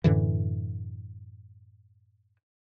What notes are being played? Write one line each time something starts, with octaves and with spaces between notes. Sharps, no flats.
F#2 A2 D3 E3